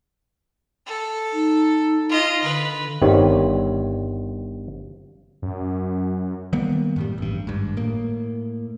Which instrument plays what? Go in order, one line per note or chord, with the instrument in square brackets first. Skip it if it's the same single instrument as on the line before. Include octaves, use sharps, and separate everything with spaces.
[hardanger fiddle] A4
[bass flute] D#4
[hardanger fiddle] F4 D#5
[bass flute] D3 [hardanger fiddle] B4
[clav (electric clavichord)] G1 G2 D#3 G3 C4 C#5
[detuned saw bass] F#2
[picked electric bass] D#3 G3 A#3 B3
F#2 A2 G3
A1 G2
G#1 G2
A2 A#3